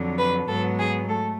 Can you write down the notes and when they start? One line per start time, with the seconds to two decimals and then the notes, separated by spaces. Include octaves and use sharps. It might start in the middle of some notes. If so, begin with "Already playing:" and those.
Already playing: F2 D3 F#3
0.18 B4
0.48 G#2 F#3 B3 A4
0.78 G#4
1.08 A3 A4